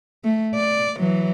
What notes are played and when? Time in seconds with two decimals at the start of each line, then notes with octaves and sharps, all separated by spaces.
0.24 A3
0.54 D5
0.99 E3 F#3